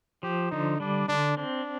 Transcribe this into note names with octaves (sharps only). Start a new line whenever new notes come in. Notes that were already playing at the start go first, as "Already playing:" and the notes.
F3 G4
D3 D#4
G3 D4
D3 D4
C4 D4